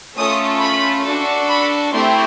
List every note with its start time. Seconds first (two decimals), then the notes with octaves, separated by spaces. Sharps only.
0.16 A3 C#4 F4 A4 D#6
0.61 B5
1.05 D4 F#4 A4
1.49 B5
1.93 A3 C4 E4 G4 C6